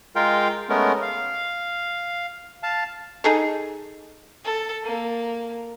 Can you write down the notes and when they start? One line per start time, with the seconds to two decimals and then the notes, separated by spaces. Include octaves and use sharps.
0.16 G#3 F4 A#4 F5 G5
0.69 G#3 A3 B3 C#4 A#4
1.02 F5
2.63 F5 A5
3.24 D#4 G#4 A4
4.44 A4
4.84 A#3